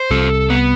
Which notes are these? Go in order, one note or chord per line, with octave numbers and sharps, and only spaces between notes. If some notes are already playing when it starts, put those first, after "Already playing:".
Already playing: C5
C2 C3 A4
B3